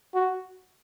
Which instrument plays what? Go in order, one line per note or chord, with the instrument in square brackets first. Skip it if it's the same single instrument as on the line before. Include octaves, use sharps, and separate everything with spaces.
[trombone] F#4